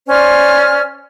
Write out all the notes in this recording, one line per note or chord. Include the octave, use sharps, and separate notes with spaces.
C#4 C5 D5 F6